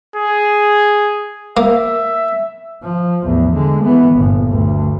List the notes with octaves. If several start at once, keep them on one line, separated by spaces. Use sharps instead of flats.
G#4
A#3 E5
F3
A1 E2
D3 G#3
E3 B3
G1 A#2
D2 G2